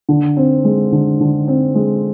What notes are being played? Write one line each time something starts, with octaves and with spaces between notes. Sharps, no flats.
D3
C4
G#3
D3
D3
C4
G#3